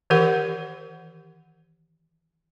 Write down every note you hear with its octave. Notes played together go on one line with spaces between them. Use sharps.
D#3 E3 G4 A#4 F#5